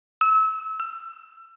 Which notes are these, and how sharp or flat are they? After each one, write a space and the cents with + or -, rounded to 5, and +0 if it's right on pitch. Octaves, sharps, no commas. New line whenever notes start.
E6 -30
E6 +25